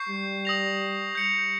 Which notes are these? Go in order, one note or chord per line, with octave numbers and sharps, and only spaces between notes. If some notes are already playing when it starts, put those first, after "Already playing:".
Already playing: C#6 G6 C7
G3
D#6 A#6 F7
G3 G6 C#7 F7